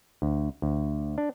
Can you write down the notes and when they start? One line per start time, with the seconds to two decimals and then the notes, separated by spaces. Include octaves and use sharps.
0.22 D2
0.62 D2
1.18 D4